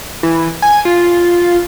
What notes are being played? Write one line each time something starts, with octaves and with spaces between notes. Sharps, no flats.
E3
G#5
F4